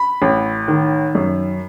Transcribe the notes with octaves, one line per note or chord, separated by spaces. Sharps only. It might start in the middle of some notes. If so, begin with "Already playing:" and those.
Already playing: B5
A1
D#3
F#2